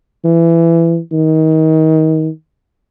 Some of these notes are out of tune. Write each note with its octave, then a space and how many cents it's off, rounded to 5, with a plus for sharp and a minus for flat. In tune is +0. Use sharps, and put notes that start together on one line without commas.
E3 +20
D#3 +25